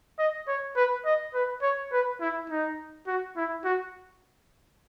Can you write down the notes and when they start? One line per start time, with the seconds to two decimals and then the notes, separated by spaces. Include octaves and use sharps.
0.19 D#5
0.48 C#5
0.76 B4
1.05 D#5
1.34 B4
1.62 C#5
1.92 B4
2.21 E4
2.50 D#4
3.07 F#4
3.37 E4
3.65 F#4